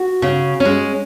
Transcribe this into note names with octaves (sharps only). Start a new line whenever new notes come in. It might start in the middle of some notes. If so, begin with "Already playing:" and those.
Already playing: F#4
C#3
C#4
G#3